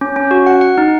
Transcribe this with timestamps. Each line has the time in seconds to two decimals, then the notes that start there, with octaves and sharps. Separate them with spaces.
0.01 C#4
0.16 C#4
0.31 F#4
0.46 F#5
0.61 F#5
0.78 D#4